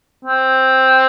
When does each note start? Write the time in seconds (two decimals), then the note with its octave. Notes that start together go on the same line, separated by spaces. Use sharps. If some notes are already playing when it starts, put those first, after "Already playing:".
0.25 C4